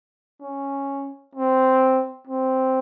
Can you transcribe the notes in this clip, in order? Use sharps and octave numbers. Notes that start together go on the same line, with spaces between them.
C#4
C4
C4